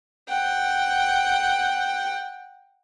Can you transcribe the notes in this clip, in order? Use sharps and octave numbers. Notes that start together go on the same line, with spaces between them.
F#5 G5